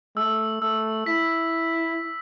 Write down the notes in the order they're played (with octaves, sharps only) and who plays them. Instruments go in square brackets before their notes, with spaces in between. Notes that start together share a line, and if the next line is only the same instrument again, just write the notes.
[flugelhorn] A3 [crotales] E6
[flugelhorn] A3 [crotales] E6
[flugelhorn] E4 [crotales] B6